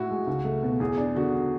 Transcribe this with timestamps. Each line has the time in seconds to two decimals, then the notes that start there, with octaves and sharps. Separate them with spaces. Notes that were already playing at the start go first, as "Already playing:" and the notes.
Already playing: A2 E4 F#4
0.10 G#3
0.27 C#2
0.45 A3
0.63 B2
0.80 E2 G#4
0.98 D4
1.15 D3 F#4